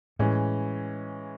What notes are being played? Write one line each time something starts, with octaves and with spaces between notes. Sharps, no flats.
A2 E3 G#3 C#4